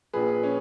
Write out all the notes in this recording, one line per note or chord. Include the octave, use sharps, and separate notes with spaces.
A#1 A#2 F3 G#4 B4
C#4